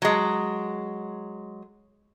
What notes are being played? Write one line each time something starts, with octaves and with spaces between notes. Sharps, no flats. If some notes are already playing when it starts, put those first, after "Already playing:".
F#3 G#3